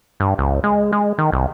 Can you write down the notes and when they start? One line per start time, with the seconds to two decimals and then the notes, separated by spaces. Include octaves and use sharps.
0.20 G2
0.38 C#2
0.64 G#3
0.93 G#3
1.18 D#3
1.32 C2